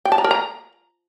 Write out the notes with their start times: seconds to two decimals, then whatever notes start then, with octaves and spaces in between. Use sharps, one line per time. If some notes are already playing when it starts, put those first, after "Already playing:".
0.05 G5
0.12 A5
0.18 A#5
0.24 A#4
0.31 A#5